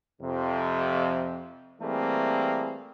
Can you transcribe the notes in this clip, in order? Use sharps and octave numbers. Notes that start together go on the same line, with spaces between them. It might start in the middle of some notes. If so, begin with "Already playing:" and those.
F2 C3
E3 G3 A3 A#3 C4 G#4